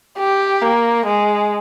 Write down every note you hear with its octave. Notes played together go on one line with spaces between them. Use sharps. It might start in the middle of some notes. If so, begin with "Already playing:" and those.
G4
A#3
G#3